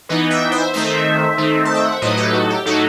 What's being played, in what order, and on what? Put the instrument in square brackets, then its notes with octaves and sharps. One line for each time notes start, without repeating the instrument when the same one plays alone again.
[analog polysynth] E3 B3 D#4 B4 D#5
E5 G5
C5 E5
D#3 A3 C4 D#4 C5 E5
D#3 A3 C4 D#4
A5
G5
F#5
E5
A2 F#3 A3 D#4 B4 D#5
G4 B4
F#4 A4
G4
A2 F#3 A3 D#4 F#4 A4